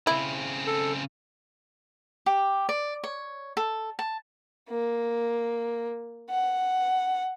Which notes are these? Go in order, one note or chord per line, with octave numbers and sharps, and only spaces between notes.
C#3 C4 E4
A4
G4
D5
C#5
A4
A5
A#3
F#5